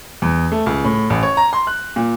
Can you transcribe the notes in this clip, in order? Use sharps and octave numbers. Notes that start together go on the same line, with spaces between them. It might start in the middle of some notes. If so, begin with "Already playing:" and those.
E2
A3
C#2
A2
A1
C#5
A#5
C6
F#6
A#2